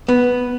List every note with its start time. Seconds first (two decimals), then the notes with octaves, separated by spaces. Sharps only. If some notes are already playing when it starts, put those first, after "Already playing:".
0.09 B3